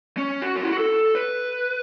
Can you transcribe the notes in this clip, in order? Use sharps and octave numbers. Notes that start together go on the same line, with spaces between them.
C#4
F#4
C#4
E4
F#4
A4
B4